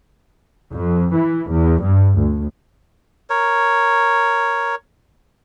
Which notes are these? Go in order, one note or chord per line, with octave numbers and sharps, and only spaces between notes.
F2
E3
E2
G2
D2
A#4 C#5